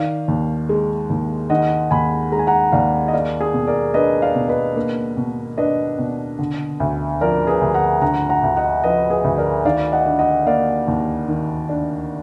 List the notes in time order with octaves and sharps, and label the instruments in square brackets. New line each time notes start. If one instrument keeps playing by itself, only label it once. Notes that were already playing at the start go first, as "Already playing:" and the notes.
Already playing: [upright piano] D#3 [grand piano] D5 F5
[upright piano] D#2
G#3
D#2
[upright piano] D#3 [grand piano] D#5 F#5
[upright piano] D#2 [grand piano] G#5 B5
[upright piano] G#3 [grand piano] A#5
[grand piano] G#5
F#5 A#5
[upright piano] D#2 [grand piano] D5 F5
[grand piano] D#5
[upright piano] A#3 [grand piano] D5 F5
[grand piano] G#4
[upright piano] B2
[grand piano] A#4 D5
[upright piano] D4 [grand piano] B4 D#5
[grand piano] D5 F5
[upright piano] B2
[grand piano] B4 D#5
[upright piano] A#3
B2
[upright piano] D4 [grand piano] B4 D#5
[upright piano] B2
D3
D2
[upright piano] F3 [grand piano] A#4 D5
[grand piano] G#4 B4
[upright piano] D2
[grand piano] F#5 A#5
[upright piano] D3 [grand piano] F#5 A#5
[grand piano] F#5 A#5
[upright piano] D2
[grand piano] D#5 F#5
[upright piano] F3 [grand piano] B4 D#5
[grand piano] G#4 B4
[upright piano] D2
[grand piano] A#4 D5
[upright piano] D#3 [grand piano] D5 F5
[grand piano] D#5 F#5
[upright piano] D4
[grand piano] D#5 F#5
[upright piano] A#3 [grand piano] D5 F5
[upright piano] D#2
D#3
D4